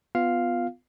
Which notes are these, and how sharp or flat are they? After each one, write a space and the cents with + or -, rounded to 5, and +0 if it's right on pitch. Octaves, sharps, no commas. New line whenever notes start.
B3 +15 F4 +0 F5 +0